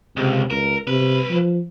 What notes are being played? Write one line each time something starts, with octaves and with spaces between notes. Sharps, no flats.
C#2 C3
C#2 A#4
C2 C3 B4
F3